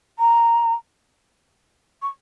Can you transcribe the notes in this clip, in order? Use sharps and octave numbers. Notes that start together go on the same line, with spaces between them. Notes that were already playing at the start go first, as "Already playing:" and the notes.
A#5
C#6